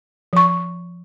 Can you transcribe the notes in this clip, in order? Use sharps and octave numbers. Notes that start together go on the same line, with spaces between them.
F3 C#6